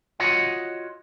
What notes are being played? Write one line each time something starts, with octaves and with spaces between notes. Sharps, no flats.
F4 F#4 C#5 D#5 F#5